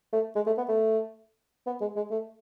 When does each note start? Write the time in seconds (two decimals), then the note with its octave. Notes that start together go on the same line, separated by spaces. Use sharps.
0.13 A3
0.36 G#3
0.47 A3
0.58 B3
0.69 A3
1.67 B3
1.81 G#3
1.96 G#3
2.11 A3